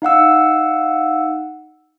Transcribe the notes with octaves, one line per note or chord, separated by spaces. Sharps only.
D#4 F5 F#5 E6